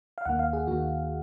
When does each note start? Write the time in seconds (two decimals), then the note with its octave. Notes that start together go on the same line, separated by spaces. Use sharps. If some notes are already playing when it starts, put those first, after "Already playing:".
0.18 F5
0.25 D#2 D#3 A#3 F#5
0.39 F5
0.53 G#4
0.67 D#2 D#3 A#3 F#4